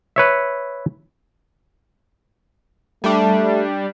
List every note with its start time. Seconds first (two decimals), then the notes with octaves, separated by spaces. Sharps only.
0.16 B4 C#5 E5
3.04 G3 A3 D4